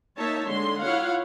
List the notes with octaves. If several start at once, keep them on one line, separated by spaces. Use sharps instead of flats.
A#3 D#4 C#5 E5 A5
D3 G#3 C6
E4 F4 C#5 F5 F#5